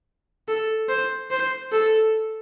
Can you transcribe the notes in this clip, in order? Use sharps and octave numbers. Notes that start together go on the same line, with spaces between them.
A4
C5
C5
A4